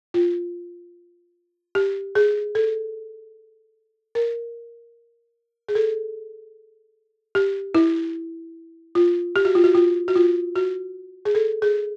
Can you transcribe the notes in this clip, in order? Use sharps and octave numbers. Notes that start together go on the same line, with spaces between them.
F4
G4
G#4
A4
A#4
G#4
A4
G4
E4
F4
G4
F#4
F4
F#4
F4
F#4
F4
F#4
G#4
A4
G#4